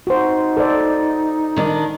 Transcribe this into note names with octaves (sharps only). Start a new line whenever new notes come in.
D#4 F#4 C5
A4 C5 D5
D#3 D4